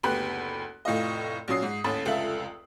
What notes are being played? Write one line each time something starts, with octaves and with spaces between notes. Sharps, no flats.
F#1 D2 B3 G4 B5 F#6
F1 A2 F4 D#5
A#1 F#3 C#4 D#6 C7
G#2
A1 D#2 C#4 A4 B5
F1 C#2 F4 A4 E5 F#7